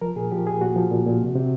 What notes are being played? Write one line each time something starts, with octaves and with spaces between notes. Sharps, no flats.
F3 A#4
A#2 G#4
F3 G4
A#2 G#4
A#2 F#4
F3
A#2
A#2
C3
C3